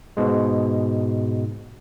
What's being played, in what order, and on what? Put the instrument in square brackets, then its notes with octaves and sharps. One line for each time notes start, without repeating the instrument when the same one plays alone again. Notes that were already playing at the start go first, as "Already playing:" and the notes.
[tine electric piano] G#2 B2 G#3